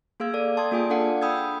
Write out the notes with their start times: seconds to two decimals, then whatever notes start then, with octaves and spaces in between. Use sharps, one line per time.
0.20 A#3 G#4 F5 E6 G#6
0.34 A4 D5
0.57 G5 A5 C6 D#6 G#6
0.72 A#3 F4 G#4 D5 G#5
0.90 D4 A4 D5 F5 F#5 C#7
1.22 G5 B5 D#6 E6 G6 G#6